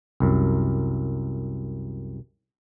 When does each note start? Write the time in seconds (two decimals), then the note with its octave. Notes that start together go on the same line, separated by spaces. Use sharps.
0.20 C2 F#2